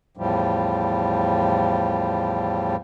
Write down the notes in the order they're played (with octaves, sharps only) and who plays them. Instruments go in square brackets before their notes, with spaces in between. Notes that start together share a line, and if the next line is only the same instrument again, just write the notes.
[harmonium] E2 A2 F3 G3